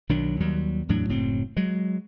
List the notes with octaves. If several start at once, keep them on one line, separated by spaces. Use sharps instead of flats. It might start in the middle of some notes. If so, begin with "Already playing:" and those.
B1 D#3 F#3 D4
D#2 F#3 G3
E2 A2 F#3 D4
F#1 A2 F#3 C4
F#3 G#3